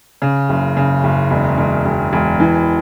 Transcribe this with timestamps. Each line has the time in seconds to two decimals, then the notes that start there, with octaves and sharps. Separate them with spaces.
0.22 C#3
0.49 F#1
0.77 C#3
1.04 F#1
1.30 E1
1.58 E1
1.85 E1
2.13 E1
2.40 E3